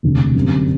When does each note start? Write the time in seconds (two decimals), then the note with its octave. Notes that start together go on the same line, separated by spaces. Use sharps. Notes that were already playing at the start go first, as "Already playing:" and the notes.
0.03 E1 D2 C3
0.34 G1 F#2 D3 G3 C4